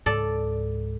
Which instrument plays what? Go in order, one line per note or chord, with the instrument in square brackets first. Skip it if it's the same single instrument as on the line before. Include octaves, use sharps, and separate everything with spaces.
[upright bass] C#2 G#2 [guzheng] A4 D5